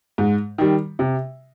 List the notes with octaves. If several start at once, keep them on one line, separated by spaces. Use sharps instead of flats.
G#2
D#3 G3
C3